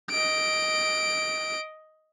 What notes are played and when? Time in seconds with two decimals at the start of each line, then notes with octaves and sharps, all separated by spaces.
0.10 D#5 D7